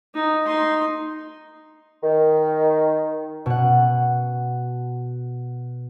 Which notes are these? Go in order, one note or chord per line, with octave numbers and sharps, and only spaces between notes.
D#4
D#4 C6
D#3
B2 F#5